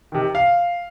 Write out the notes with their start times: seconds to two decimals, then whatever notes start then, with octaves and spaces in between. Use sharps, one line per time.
0.12 C3 D#3
0.35 F5